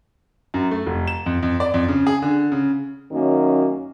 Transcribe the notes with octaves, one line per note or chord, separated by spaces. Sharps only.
F#2
A3
F1
E7
F2
F2
D5
F2
C#3
G#4
D3
C#3
F#2 D#3 A#3 C#4